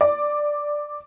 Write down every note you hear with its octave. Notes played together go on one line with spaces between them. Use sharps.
D5